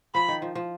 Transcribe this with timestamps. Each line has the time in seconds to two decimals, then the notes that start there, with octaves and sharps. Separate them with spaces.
0.14 F3 B5
0.28 D#3
0.42 F3
0.55 F3